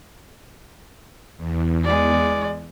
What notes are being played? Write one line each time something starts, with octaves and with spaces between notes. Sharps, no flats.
E2
G#3 D5